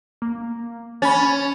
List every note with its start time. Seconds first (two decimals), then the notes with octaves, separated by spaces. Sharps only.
0.22 A#3
1.02 C#4 B5 A6